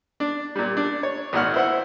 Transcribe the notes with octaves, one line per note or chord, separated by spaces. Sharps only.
D4
A#2 G3
D4
C#5
G#1 A#2 F#5 F6
E4 C5 F#5